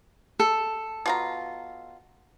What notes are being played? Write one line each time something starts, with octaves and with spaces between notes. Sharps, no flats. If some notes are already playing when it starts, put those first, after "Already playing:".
A4
B2 F4 A#5